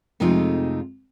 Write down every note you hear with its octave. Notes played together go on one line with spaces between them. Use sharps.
F2 C3 G#3 A3 D#4 F4